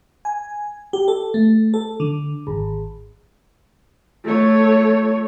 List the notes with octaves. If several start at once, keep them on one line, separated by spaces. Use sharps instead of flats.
G#5
G4
A4
A3
A4
D3
G#1
A3 C#5